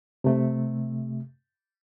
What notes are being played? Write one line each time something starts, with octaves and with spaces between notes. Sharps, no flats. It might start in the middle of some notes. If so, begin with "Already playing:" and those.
C3 A3